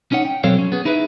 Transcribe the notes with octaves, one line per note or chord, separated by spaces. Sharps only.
C#4 D#4 C#5 F#5
G5
B2 F#3 C4 A4 C#5 F5
C#4
B3 G#4
D#4 E4 G#4 B4 E5